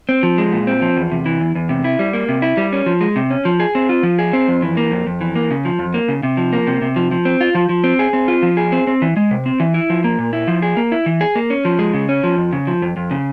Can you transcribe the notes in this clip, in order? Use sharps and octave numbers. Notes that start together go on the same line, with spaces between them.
C4
F3
G#3
A#2
C4
F3
E2
C3
E3
E2
E2
C3
E4
G3
A#3
C3
E4
G3
C#4
F3
G#3
C3
C#4
F3
G#4
C4
F4
F3
G#4
C4
F2
E3
A#3
F2
F2
E3
A#3
C#3
F3
F2
A#3
C#3
C3
F3
A#3
C3
C3
F3
F3
C4
F4
F3
F3
C4
G#4
C4
F4
F3
G#4
C4
C4
E3
G#3
C3
C4
E3
E4
F3
A#3
A#2
E4
F3
G#4
A#3
E4
E3
G#4
A#3
C#4
F3
G#3
C#3
C#4
F3
F2
C#3
F3
F2
F2
C#3